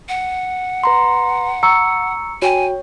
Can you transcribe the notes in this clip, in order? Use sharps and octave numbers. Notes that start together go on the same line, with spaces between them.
F#5
B4 A#5 C6
A#5 C#6 E6 C#7
F#4 C#5 G5 G#5